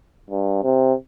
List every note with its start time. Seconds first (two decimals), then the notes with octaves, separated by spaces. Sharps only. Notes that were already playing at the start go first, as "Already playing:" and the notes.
0.30 G2
0.63 C3